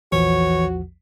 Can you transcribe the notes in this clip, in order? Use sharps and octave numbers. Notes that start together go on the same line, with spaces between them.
A#1 E2 E3 F3 F#4 C#5